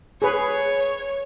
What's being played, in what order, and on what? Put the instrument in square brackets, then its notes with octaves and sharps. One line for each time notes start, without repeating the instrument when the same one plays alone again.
[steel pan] G#4 B4 [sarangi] C#5